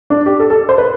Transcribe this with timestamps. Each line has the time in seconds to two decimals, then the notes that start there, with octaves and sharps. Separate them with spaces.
0.10 D4
0.26 G4
0.40 A4
0.50 A4
0.69 C5
0.78 B4